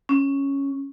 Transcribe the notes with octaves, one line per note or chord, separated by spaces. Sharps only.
C#4